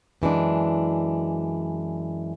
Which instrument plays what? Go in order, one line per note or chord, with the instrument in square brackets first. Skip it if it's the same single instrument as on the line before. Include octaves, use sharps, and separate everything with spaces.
[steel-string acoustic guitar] F#2 E3 G#3 D4